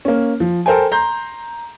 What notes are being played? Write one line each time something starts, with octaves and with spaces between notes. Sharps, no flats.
A#3 C#4
F3
A4 A#4 C5 G5 G#5
A#5 C6 G6